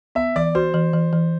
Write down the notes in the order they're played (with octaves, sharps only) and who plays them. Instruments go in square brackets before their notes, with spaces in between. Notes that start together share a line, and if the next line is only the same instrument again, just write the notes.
[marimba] B3 [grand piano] E5
[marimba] E3 [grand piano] D5
[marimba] F#4 [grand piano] C5
[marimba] E3
E3
E3